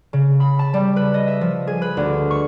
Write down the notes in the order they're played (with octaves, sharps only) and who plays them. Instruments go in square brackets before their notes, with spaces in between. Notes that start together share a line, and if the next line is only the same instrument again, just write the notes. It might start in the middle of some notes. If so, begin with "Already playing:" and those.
[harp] C#3
B5
A5
G3
B4
D#5
E5
F3
G#4
B4
D2
C#6